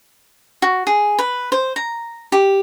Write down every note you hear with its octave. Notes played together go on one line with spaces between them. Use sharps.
F#4
G#4
B4
C5
A#5
G4